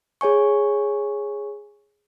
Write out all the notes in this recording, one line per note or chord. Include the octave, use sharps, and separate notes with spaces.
G#4 C#5 G#5 C#6